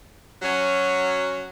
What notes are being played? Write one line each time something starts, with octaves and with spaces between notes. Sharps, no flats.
F#3 C#4